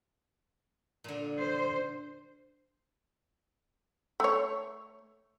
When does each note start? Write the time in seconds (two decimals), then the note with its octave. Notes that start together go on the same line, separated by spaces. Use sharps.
1.04 A#2 D3
1.39 C5
4.20 A3 C#5